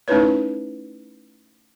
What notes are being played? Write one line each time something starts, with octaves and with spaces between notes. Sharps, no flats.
A3 C#4 D#4 E4 B4 C#5